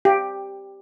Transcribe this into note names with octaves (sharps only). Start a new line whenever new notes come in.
G4